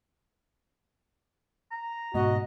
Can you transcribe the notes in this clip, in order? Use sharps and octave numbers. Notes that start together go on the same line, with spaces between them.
A#5
G#2 B2 F#4 D#5